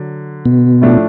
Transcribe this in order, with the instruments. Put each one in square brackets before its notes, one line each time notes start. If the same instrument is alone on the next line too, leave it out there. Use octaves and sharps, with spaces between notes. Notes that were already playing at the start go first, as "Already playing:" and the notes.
Already playing: [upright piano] D3 F#3
[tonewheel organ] B2
[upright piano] A2 F3 A3 D4